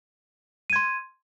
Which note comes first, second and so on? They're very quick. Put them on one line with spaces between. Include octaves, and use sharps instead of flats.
D#7 G#6 C6